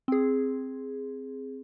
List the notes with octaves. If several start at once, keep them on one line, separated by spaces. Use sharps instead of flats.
C4 G#4